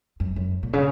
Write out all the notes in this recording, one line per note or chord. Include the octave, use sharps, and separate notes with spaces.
F#2
F#2
A#2
C#3